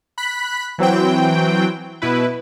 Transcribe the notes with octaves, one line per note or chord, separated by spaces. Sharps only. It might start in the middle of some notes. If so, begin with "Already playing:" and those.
B5 F#6 B6
E3 F#3 C4 G5
B2 E4 B4